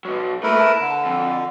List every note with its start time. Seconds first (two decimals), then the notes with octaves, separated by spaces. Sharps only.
0.05 B2 F#3
0.43 A3 A#3 E4 A#4 B4
0.60 A5
0.81 D3
1.05 F2